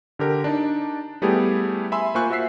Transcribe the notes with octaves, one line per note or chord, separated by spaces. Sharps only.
D3 G4 A#4
D4 D#4 D5
G3 A3 B3 E4 G4 G#4
E5 G#5 B5 C6 E6
A#3 F4 C5 G#5 C#6 F#6
F4 F#4 E5 E6 B6 C7